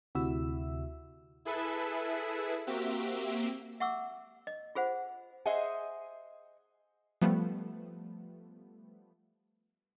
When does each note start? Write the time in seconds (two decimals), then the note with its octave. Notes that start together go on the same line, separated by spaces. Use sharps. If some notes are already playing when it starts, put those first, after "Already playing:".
0.15 D2 C3 E4 F#4 E5 E6
1.45 E4 G#4 A4 B4 E5
2.67 A#3 C4 F#4 G4 E5
3.80 E5 F#5 C#6 D6 E6
4.47 D#5
4.75 F4 G#4 C5 F#5
5.46 G#4 C5 D#5 E5 F#5 G#5
7.22 F3 G3 A3 B3